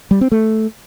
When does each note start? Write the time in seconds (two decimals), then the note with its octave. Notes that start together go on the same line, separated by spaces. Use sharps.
0.11 G3
0.21 C4
0.32 A3